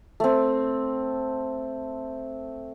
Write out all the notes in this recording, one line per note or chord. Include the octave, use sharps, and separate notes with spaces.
A3 C4